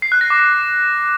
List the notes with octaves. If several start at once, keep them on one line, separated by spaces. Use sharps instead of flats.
C7
F#6
A#6
D6
C7